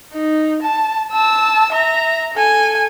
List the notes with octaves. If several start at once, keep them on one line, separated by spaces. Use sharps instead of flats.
D#4
A5
A5 E6
E5 A#5
A4 G#5